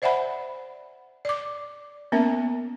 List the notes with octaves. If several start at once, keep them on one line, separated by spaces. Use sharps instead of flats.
C5 D5 E5 F#5 G#5 B5
D5 D6
A#3 B3 C#4 A#4 E5